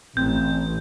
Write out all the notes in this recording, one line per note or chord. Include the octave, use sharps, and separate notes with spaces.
A1 C4 G6